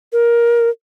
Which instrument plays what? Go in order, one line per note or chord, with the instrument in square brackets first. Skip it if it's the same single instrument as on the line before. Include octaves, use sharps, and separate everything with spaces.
[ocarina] A#4